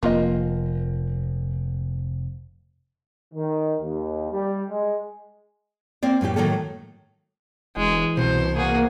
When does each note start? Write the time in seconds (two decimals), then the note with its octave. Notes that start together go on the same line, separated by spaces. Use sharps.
0.03 F1 A#3 F4 D#5
3.33 D#3
3.80 D#2
4.31 G3
4.69 G#3
6.03 A#3 C4 D5
6.21 F#2 A2 A#3 G4
6.36 A2 D#3 F#3 A#3 A4
7.77 E1 E3 G#3
8.17 C2 B2 C5
8.56 E2 A#3 F#4 G#4